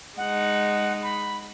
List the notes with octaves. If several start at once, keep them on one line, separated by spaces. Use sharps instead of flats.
G#3 D#4 F#5
B5